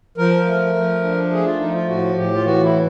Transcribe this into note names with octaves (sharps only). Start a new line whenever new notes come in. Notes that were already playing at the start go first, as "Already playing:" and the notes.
F3 A#4
A3
F3
D4
A3 G#4
F4
F3 D#4
F4
A2 F#4
A2 G4
F4
E3 F#4
E4